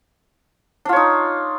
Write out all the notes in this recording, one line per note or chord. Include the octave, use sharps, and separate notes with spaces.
D4 D#4 F4 C#5